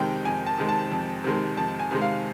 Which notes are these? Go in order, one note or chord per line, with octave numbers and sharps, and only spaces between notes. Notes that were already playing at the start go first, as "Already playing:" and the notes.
Already playing: F2 C3 D#3 G#3 G5
F2 G#5
A5
C3 D#3 G#3
A5
F2
C3 D#3 G#3
F2 A5
G#5
C3 D#3 G#3
F5